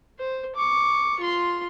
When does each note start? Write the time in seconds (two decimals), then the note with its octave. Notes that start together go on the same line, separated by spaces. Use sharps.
0.19 C5
0.55 C#6 D6
1.19 F4 C6